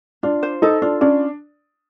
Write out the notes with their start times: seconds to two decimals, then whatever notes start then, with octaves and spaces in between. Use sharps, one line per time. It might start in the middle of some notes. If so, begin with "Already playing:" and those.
0.23 D4 F4
0.43 C5
0.62 D#4 A4
0.82 D4 F4
1.01 C#4 D4